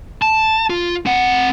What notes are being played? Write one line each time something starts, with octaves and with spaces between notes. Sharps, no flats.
A5
F4
C4 F#5